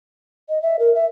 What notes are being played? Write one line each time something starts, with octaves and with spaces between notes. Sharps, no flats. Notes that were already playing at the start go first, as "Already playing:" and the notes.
D#5
E5
A#4
E5